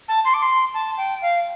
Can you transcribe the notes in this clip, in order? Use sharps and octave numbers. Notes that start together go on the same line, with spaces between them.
A5
C6
D6
C6
A5
G5
F5